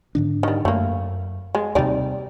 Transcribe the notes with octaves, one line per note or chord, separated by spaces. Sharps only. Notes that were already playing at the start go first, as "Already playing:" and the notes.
G#2 D3 D4
D#3 G3
F#2 A3 A#3
G#3
D#2 C3 G3 D#4 D5